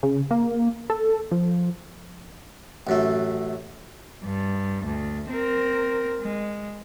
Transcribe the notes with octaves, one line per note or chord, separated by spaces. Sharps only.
C#3
A#3
A4
F3
A1 F#2 A3
G2
D2
C4 A#4
G#3